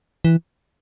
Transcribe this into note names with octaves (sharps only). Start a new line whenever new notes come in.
E3